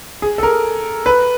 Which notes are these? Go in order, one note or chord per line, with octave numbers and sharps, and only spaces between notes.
G#4
A4
A#4
B4